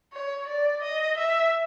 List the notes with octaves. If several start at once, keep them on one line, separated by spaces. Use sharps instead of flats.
C#5
D5
D#5
E5